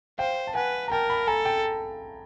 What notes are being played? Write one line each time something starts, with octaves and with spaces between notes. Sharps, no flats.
C5 F5 G5
A5
B4 F#5 G#5
A#5
A#4 G5 A5
A5 B5
A4 G#5 A#5
G5 A5